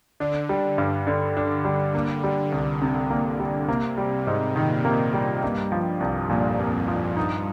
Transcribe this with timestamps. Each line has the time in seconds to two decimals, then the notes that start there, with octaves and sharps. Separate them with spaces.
0.20 D3 D4
0.49 G3
0.78 G2
1.07 D3
1.37 D4
1.65 G3
1.94 D3 A#3
2.24 G3
2.52 C2
2.82 C3
3.10 A#3
3.40 G3
3.68 C3 A#3
3.97 G3
4.27 G#2
4.56 A#2 D#3
4.85 A#3
5.13 G3
5.43 G2 A#3
5.72 F3
6.00 C2
6.30 F2 A#2
6.60 A#3
6.88 F3
7.16 G2 D#4